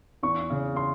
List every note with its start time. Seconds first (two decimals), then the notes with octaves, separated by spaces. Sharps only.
0.23 E2 C#6
0.50 C#3
0.76 C6